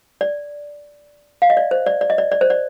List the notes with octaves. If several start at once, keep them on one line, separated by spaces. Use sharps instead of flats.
D5
F5
D#5
D5
C5
D5
D5
D#5
D5
D5
C5
D5